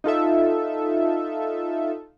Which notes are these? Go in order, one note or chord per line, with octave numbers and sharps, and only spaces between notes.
D#4 F4 A4 E5